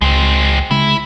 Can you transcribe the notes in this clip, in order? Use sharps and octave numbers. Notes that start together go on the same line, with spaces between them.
C#2 G#3 C4
C#3 G#3 E4